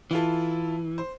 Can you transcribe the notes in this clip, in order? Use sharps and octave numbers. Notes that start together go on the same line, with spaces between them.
E3 E4 F4 A4
C5